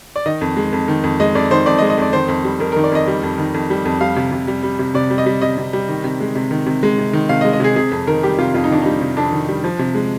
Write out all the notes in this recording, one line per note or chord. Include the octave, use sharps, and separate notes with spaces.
D5
D#3 D#5
F2
G#3
F2
D#3
F2
G#3 D#5
F2 D5
D#3 C5
F2 D5
D#5
G#3
D#5
F2 D5
D#3 C5
F2
G3
F2 A#4
A#4
D#3
D5
F2 D#5
G3
F2
D#3
F2
G3
F2
G3 F5
C3
C3
G3
G3
C3
C3 D5
G3
D#5
G3
C3 D#5
C3
G3
D#3
C3
G#3
C3
D#3
C3
G#3
C3
D#3
C3 F5
D#5
G#3
D#5
C3 G#4
C3 G#4
F2
D#3 A#4
G3 G4
C3 F4
F2 F4
D#4
D#3 D4
G3 D#4
C3
F2 D4
D#3
G3
F3
C3
G#3